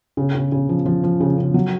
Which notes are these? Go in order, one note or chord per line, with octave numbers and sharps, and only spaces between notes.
C#3
C#3
C#3
F3
F3
F3
C#3
C#3
F#3